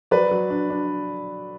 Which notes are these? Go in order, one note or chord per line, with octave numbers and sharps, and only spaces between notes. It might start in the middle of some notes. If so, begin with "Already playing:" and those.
F#3 B4 D5
F#3
D4
D4